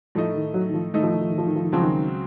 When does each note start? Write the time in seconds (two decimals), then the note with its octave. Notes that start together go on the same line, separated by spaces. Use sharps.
0.15 A2 F3 A3 D#4 A4 D#5
0.35 D#3
0.54 F#3
0.69 D#3
0.74 F3
0.94 A2 D#3 A3 D#4 A4 D#5
1.03 F3
1.11 D#3
1.21 F3
1.29 D#3
1.38 F3
1.47 D#3
1.56 F3
1.63 D#3
1.72 C#2 C#3 F3 F#3 C4 F#4
1.82 D#3